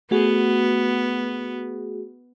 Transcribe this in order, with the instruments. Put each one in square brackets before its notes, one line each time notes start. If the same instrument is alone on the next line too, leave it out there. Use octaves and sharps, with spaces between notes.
[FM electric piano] A3 F#4 G#4 [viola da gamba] B3